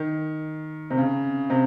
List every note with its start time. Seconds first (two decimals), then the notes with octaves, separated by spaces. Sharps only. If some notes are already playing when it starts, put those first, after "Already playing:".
Already playing: D#3
0.90 C3
0.98 C#3
1.50 C3